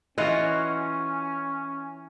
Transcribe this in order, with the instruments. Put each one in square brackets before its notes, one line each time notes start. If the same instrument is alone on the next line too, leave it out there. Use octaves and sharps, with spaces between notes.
[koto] E3 F4 F#4 [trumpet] C#4 [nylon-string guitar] D#5